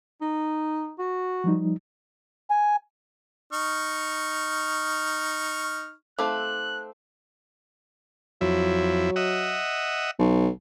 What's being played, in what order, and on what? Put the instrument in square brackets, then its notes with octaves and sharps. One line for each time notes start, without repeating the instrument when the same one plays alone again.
[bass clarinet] D#4
F#4
[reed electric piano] F3 G3 D#4
[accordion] G#5
[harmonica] D#4 C#6 F6
[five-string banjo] A3 C4 A4 [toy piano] D#4 F5 D6 [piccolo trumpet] F#6
[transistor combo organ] F2 E4 [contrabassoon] F#3
[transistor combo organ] D#5 E5 F#5
[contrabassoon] B1